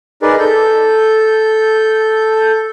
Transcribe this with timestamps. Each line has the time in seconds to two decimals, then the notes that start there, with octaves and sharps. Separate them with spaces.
0.22 D#4 G#4 A#4 B4 D5
0.39 A4 G6